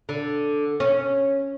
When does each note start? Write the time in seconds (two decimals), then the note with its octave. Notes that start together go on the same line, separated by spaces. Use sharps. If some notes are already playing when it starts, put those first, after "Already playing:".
0.09 D3
0.80 C#4